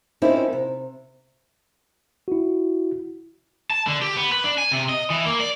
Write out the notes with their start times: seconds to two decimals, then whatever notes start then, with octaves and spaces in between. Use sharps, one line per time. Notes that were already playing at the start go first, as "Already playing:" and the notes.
0.22 F3 A#3 C4 C#4 D#4 E4
0.53 C3
2.28 E4 F#4
3.70 A5
3.87 D3
4.02 G4
4.17 B3
4.32 B4
4.44 D4
4.58 G#5
4.71 C3
4.89 D#5
5.10 E3
5.25 A#3
5.40 D5